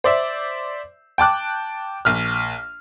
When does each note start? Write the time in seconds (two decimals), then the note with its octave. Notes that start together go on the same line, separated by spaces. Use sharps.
0.04 C5 D5 E5
1.18 G5 A5 D6 F#6
2.05 A#1 F6